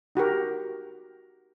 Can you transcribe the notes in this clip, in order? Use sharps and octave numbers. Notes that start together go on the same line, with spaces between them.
D#4 F#4 G4 A#4